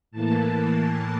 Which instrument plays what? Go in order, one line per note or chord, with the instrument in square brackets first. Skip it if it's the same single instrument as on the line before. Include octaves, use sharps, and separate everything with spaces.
[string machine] A2 E3 A#3 A5